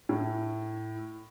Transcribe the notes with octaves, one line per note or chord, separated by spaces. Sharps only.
A2